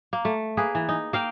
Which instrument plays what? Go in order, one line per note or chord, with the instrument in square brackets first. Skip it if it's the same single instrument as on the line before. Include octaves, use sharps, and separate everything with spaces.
[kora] A#3
A3
A#3 G#4 B4
E3
D#4
A#3 F5 G5